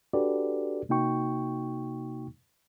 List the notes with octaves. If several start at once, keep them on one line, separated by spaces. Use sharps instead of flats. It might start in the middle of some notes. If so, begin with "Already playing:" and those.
D4 F#4 G4 A4 B4 D5
C3 A#3 D#4 F#4 G5 C#6